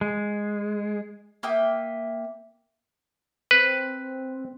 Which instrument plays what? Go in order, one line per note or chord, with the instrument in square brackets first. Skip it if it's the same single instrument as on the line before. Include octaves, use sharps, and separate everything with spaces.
[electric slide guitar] G#3
[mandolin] A#3 E5 G5 D#6
[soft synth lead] C4 [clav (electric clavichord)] B4